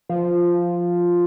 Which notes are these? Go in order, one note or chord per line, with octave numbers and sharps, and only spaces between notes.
F3